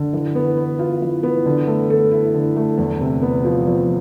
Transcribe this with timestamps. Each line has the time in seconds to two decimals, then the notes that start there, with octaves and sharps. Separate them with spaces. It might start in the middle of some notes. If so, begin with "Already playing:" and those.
Already playing: D3
0.13 E3
0.35 B3
0.57 B4
0.79 F4
1.02 E3
1.23 B3
1.46 D3
1.67 A3
1.90 A4
2.11 E4
2.34 D3
2.56 A3
2.78 E2
3.01 C3
3.22 B3
3.45 F3
3.67 E2